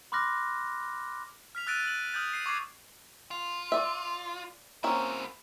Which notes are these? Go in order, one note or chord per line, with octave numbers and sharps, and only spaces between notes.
B5 C6 D6 F6 F#6 A#6
F6 B6 F7
E6 F#6 A6 D7 D#7
F#7
D#6 F6 G6 A6
C7 D#7
C#6 D6 G#6 C7
F4
D5 E5
A#3 C4 C#4 E4 F#4